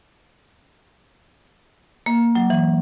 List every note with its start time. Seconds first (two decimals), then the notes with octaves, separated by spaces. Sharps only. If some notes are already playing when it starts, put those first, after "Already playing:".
2.06 A#3
2.35 F#3
2.50 E3